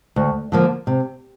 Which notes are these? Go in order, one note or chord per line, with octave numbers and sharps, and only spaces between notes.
D2
D3 F3 A#3
C3